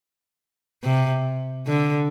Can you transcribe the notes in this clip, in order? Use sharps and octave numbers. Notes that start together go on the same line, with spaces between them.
C3
D3